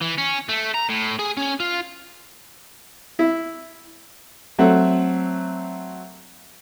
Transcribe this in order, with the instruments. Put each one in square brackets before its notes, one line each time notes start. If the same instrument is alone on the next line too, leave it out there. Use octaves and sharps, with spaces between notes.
[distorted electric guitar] E3
C#4
A3
A#5
A2
G#4
C#4
F4
[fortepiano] E4
F#3 A3 C4 E5 F#5